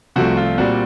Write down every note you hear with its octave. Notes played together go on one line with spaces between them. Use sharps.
C2 C3 F3 A3 C4 F#4
F4
A#2 G3 C4 F#4